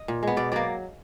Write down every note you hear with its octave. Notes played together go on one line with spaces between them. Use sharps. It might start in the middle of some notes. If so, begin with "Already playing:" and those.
Already playing: D#5
A#2
G#3 B3
B2 D5
F#3 A#3 D5